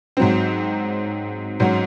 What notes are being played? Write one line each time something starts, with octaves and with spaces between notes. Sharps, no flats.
G#2 F#3 C4
G#2 F#3 C#4 F#4